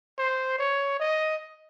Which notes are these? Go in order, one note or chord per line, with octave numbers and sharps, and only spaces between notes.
C5
C#5
D#5